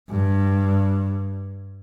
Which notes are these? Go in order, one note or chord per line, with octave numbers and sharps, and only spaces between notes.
G2